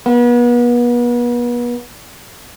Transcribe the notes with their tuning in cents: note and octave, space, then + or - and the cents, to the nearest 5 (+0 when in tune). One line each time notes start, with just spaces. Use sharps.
B3 -35